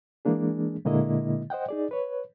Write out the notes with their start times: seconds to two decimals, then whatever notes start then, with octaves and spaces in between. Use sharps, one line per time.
0.25 E3 G#3 A#3 D4 G#4
0.85 A#2 D3 G#3 A#3 E4 D#5
1.50 C5 D#5 F#5 G5
1.69 D#4 G#4 D5
1.91 B4 C#5